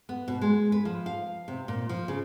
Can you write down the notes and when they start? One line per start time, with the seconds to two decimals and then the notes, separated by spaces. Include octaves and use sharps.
0.09 B3
0.28 B2
0.41 G#3
0.72 B4
0.85 F3
1.06 F5
1.48 C3
1.68 A#2
1.89 F3
2.08 C#3